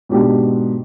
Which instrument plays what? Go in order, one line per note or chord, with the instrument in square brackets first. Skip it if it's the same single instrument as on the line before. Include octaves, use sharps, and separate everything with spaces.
[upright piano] G#2 B2 D4 G4